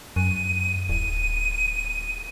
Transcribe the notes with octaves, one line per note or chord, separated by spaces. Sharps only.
F#2 D#7
D1 D#7